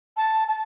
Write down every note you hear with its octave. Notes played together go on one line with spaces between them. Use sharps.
A5
A5